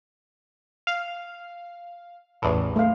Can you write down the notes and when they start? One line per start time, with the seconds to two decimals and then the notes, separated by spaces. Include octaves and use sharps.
0.87 F5
2.42 A1 E2 A2
2.76 A3 F5